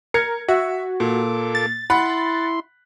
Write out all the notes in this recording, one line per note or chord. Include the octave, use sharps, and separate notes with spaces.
A#4 G#6 C#7
F#4 E5
A#2 A#3 A4 D6
A6
E4 F#5 B5 C6